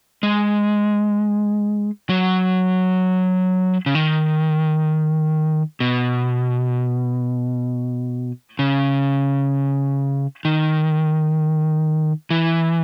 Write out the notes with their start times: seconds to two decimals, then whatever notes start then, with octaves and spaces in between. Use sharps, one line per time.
0.23 G#3
2.09 F#3
3.86 C#3
3.95 D#3
5.80 B2
8.59 C#3
10.45 D#3
12.30 E3